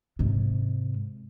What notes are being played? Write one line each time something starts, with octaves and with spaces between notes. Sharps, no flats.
G#2 C3